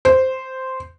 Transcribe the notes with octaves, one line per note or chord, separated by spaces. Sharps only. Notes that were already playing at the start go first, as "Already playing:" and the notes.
C5